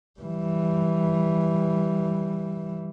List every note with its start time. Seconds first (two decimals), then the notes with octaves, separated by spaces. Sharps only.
0.20 E3 G3